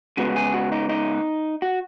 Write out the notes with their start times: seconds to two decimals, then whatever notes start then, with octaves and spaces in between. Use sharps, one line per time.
0.17 C#3 G#3 B3 F#4
0.36 G#4
0.54 F#4
0.72 D#4
0.89 D#4
1.62 F#4